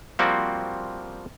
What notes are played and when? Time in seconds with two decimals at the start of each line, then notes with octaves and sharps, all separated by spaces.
0.19 F3 G3 A#3 C4 F#4